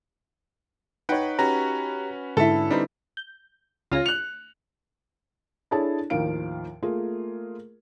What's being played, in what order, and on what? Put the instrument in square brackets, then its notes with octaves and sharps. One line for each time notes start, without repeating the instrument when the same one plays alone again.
[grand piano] D#4 C#5 [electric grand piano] B4 F#5 G5
[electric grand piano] C#4 F#4 B4 [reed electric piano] G4 A#5
[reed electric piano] G#2 [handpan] D3 E4 [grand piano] A4 E5
[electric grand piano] G3 C4 [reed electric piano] D4 D#4 B4
[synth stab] G6
[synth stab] C#2 C#4 A#6 [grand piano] F4
[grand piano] F#6 F7 [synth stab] C#7
[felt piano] D4 E4 G#4 A4 C#5 A5
D#2 A2 D#3 F3 F5 D7
A3 A#3 F4 G#4 A#4